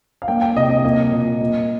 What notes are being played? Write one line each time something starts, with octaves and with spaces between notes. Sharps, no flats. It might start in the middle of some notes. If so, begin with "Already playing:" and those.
F5
A#3 G5
G5
C3 D#5
D#5
A#3 D#5
A#2
A#3